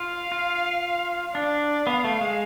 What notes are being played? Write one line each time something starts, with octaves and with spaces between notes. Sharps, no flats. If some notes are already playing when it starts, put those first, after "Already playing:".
Already playing: F4 F5
F4
D4 D5
B3 F5
A3
G#3